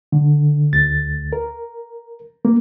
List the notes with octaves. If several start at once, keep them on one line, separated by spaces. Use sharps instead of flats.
D3
D2 A6
A#4
A#3